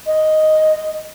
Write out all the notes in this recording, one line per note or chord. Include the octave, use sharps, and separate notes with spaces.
D#5